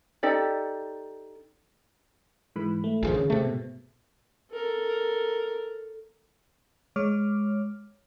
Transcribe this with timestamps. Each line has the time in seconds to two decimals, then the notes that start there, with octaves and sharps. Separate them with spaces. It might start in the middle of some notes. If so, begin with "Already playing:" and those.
0.23 D#4 G4 A4 D5
2.56 G#2 E3 B5
2.84 A3
3.03 A#1 A#2 D#3 F3 G#4
3.14 C#3
3.30 C3 A3
3.44 G#2 B2
4.52 A4 A#4
6.96 G#3 C#5 D6 F6